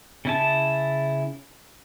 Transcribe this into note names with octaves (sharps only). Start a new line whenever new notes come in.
C#3 E4 A5